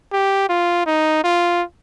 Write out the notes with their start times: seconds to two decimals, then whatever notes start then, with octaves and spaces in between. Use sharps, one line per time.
0.12 G4
0.49 F4
0.86 D#4
1.24 F4